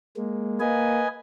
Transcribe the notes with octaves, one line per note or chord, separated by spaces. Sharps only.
G#3 A#3
A#3 B4 D#5 G#5